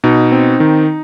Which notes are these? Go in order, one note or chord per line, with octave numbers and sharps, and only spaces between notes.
B2 D#4
C4
D#3